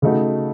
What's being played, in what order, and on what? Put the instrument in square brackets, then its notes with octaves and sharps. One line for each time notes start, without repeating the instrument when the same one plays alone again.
[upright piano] C#3 A3 D#4 F#4